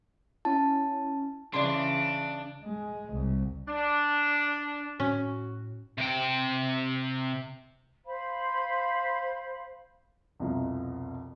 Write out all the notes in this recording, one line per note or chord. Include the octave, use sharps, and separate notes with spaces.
C#4 E4 A5
C#3 E3 D4 D5 C6
G#3
C2
D4
A2 C#4 F#4
C3 G5
C5 F5 B5
C2 F2 B2 E4 F4 A#5